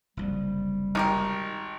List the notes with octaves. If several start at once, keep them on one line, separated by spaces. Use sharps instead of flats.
F#1 C2 F3 G3
G#1 D#4 G4 A#4